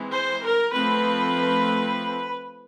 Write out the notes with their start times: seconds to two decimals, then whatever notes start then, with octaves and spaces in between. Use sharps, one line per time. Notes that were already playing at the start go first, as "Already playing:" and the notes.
Already playing: E3 G#3 C4
0.13 C5
0.43 A#4
0.72 F3 A3 C4 B4